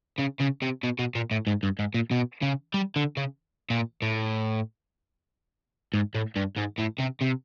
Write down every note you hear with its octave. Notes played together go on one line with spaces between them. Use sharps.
C#3
C#3
C3
B2
B2
A#2
A2
G#2
G2
G#2
A#2
B2
C#3
G3
D3
C#3
A#2
A2
G#2
A2
G2
G#2
A2
C3
C3